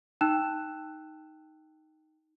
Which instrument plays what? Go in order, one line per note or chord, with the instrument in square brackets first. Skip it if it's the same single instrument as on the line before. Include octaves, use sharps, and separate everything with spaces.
[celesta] D#4 G5 A5 E6 F#6 E7